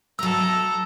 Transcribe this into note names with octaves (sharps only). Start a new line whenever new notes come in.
F#3 A3 A4 A#5 E6